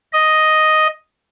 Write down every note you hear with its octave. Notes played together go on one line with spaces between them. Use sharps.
D#5